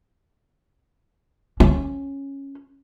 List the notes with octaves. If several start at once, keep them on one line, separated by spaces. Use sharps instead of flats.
C#4